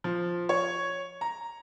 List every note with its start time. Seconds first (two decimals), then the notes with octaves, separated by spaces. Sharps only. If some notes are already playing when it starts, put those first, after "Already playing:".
0.04 F3
0.49 C#5
1.21 A#5